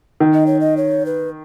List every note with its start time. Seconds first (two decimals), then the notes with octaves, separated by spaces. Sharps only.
0.20 D#3
0.34 D#5
0.47 C#5
0.60 D#5
0.77 C#5
1.06 B4